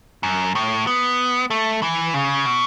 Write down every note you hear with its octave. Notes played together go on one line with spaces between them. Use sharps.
F#2
A2
B3
A3
E3
C#3
B2